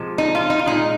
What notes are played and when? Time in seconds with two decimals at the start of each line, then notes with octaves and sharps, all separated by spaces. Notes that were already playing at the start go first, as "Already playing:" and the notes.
Already playing: C3 F3 G#3
0.18 D#4
0.35 F4
0.50 D#4
0.59 F4
0.66 A#2 G#3 D#4